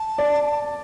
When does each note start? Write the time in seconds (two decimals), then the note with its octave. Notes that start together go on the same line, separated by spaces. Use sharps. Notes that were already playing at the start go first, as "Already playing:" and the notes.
Already playing: A5
0.18 D5